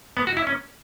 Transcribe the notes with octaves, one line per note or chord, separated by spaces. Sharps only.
B3
F#4
E4
C#4